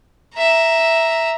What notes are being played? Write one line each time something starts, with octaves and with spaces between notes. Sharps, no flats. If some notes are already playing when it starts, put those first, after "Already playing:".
E5 A#5